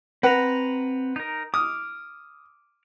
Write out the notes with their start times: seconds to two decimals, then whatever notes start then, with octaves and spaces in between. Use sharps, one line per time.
0.23 C4 B4 F#5 A#5
1.16 D#4 A#4
1.54 D6 D#6 F6